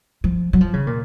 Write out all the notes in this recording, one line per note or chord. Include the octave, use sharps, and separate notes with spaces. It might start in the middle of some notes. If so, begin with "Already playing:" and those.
F3
F#3
F3
C#3
A#2